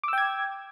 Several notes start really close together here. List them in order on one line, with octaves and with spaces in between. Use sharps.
D6 E6 G5 G#6